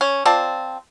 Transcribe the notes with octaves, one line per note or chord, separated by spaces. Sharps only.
C#4
C4 F4 D5 A5